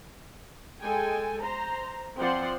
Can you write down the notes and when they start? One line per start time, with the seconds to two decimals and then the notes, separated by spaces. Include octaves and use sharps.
0.81 G#3 A4 G5 G#5
1.42 C5 A#5
2.18 F3 C4 C5 D5 F#5 C6